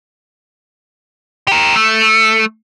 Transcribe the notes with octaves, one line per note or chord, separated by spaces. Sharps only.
G4 A#4
A3